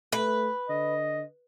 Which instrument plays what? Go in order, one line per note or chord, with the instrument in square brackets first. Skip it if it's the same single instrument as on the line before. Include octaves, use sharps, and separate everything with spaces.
[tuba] A3 [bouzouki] B4
[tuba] D3 [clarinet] D#5